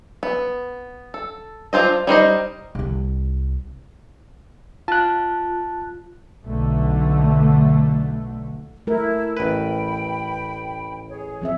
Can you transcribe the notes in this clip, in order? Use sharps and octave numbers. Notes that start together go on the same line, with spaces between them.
B3
A4
D4 F4 A4 C5 D#5
G3 D#4 C5 D#5
C2 C4
F4 A5 F#6
B1 D3 A3
A3 E4 A#4
A1 B4 G5 B5
G#4 C#5
F3 C4 E5